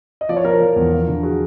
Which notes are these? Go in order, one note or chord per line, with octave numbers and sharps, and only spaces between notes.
D#5
F3 D5
C#5
F3 A#4 C5
F3
E2
F3
D3
F#4 G#4